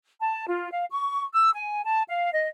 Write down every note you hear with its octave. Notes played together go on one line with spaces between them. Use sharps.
A5
F4
F5
C#6
E6
G#5
A5
F5
D#5